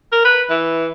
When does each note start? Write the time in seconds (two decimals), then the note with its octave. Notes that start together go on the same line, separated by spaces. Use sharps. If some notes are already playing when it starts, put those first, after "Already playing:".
0.12 A#4
0.25 B4
0.50 E3